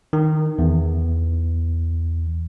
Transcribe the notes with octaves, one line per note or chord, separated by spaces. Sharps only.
D#3
E2